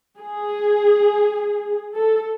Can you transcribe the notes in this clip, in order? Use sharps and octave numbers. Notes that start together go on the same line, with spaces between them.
G#4
A4